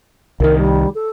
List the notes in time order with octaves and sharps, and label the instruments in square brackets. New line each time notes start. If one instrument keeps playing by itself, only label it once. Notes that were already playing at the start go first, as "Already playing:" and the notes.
[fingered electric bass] C2 D#3 [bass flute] A#4
[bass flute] G3
A4